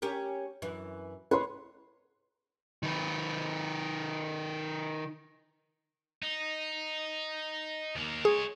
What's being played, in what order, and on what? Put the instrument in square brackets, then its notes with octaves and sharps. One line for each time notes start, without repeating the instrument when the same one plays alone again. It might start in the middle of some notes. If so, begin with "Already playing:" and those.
[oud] C#4 G4 A#4
F#2 E3
[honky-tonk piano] B4 C6 [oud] C#5
[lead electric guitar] D#3 B4
[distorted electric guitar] D#4
D#2 A#3
[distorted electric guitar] G#3 C#5 [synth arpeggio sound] G#4